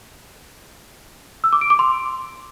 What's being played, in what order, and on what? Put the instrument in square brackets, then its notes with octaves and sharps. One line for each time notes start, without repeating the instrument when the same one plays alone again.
[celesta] E6
D6
D7
D6
C6